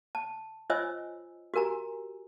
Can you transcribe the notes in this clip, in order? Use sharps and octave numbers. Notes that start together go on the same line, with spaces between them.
A5
F4 C5 C#5 D#5 G#5 E6
F#4 G4 A#4 G#5 A#5